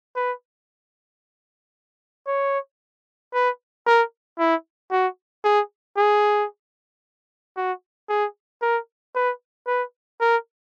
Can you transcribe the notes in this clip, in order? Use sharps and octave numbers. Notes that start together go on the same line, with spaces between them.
B4
C#5
B4
A#4
E4
F#4
G#4
G#4
F#4
G#4
A#4
B4
B4
A#4